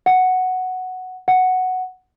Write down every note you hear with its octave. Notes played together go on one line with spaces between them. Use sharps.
F#5
F#5